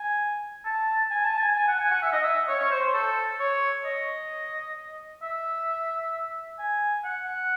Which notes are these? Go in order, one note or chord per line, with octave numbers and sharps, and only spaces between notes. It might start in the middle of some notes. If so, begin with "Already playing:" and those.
Already playing: G#5
A5
G#5
A5
G#5
G#5
F#5
G#5
F#5
E5
D#5
E5
C#5
C#5
C5
C5
A4
C#5
D#5
E5
G#5
F#5